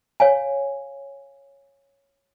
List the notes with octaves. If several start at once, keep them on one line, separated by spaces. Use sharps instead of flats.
C#5 F5 G#5